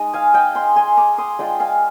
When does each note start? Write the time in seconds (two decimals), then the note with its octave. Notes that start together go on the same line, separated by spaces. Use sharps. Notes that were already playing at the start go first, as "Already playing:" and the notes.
Already playing: G#3 D#4 D#5
0.14 F5 G#5
0.34 D#5 G5
0.55 G#5 C6
0.76 G#5 C6
0.97 A#5 D6
1.18 C6 D#6
1.39 G#3 D4 F4 D#5 G5
1.60 F5 G#5